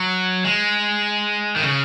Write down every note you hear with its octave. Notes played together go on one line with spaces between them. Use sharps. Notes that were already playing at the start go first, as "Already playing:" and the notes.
Already playing: F#3
G#3
D#3
C#3